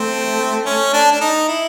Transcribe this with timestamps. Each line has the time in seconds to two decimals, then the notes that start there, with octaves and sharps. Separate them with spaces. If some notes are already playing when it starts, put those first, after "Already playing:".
Already playing: A3 C4
0.65 C#4
0.93 D4
1.11 D4
1.21 D#4
1.48 E4